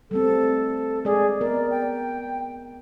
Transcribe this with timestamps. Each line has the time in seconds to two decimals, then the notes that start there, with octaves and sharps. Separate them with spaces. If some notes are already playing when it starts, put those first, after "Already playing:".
0.11 G3 A3 C4 A4
1.05 G#3 G#4 D5
1.41 B3 A#4 D5
1.71 G5